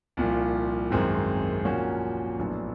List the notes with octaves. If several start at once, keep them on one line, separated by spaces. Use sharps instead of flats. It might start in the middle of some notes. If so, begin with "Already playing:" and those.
C2 A#2 F3
G#1 F#2 D#3 G#3 C4
A#2 F3 A#3 C#4 F#4
A#1 A2 F#3 B3 D4